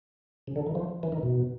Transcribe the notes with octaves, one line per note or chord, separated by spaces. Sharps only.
C#3
D3
D#3
F3
E3
D#3
B2